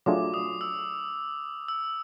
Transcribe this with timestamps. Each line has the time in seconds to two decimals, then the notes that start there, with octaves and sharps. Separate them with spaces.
0.06 F#3 A3 D4 F4 G#4 D6
0.34 D#6
0.61 E6
1.68 E6